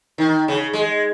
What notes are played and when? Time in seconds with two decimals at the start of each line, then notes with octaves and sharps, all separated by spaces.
0.18 D#3
0.48 C#3
0.73 G#3